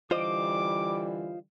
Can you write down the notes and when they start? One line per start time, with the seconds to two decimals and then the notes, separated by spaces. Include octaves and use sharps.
0.11 D3 E3 G3 F4 C5 D#5 D6